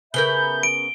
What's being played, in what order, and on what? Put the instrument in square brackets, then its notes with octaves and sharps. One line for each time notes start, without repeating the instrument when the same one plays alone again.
[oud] C#3 B3 A#4 [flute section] E5 B5 G6 [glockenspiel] G7
[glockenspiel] D7